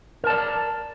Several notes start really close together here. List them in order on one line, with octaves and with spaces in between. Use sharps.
A#4 A5 D5